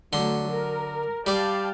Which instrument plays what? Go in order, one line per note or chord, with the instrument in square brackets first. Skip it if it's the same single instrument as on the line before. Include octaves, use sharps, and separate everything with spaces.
[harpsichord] D3 C6 [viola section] F#3 A3
[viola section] A#4
[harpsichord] G3 D5 [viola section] F5 G5 A5